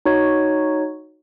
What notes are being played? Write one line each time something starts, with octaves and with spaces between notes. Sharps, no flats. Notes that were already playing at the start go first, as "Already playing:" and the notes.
D#4 F#4 C#5